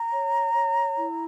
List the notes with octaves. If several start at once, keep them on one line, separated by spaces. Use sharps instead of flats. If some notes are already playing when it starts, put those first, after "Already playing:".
Already playing: A#5
C#5
C#5
E4